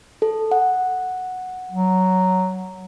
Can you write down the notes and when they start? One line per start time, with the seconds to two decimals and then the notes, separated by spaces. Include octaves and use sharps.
0.22 A4
0.51 F#5
1.71 F#3